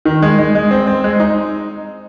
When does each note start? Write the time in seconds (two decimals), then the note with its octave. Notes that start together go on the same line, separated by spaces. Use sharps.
0.05 D#3
0.22 G#3
0.39 G#3
0.55 G#3
0.71 C4
0.87 C4
1.04 G#3
1.20 D#4